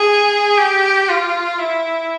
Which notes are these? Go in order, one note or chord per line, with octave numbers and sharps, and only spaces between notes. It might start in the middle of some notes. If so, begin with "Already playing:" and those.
Already playing: G#4
G4
F4
E4